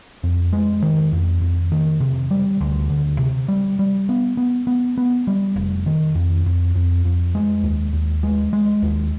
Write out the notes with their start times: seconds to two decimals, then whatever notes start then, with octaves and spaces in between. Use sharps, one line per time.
0.23 F2
0.52 G#3
0.82 D#3
1.13 F2
1.41 F2
1.72 D#3
2.00 C3
2.31 G3
2.61 D2
2.90 D2
3.19 C3
3.48 G3
3.79 G3
4.09 B3
4.37 B3
4.67 B3
4.98 B3
5.27 G3
5.56 F1
5.86 D#3
6.15 F2
6.46 F2
6.75 F2
7.05 F2
7.35 G#3
7.63 D#2
7.93 D#2
8.23 G#3
8.53 G#3
8.82 D#2